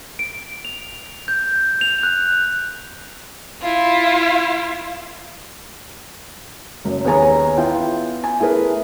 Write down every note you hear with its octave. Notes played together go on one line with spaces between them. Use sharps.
D7
F7
G6
F7
F#6
E4 F4
F#1 F#2
D#2 B3 G#4 C#5 G#5 A#5
B3 E4 F4 G5
G#5
A3 E4 G#4 A#4 B4